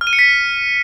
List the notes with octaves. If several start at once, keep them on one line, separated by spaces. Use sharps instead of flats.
F6
D#7
C#7
B6